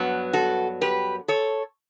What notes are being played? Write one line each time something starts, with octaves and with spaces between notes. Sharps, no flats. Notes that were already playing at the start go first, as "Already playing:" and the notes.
Already playing: G2 F#3 B3
F#4 A4
G4 B4
A4 C#5